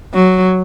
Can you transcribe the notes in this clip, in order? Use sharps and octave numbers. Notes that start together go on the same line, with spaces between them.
F#3